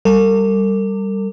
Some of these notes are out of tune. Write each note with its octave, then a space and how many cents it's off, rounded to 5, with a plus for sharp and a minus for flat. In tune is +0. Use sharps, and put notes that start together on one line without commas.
G3 +0 A#4 -45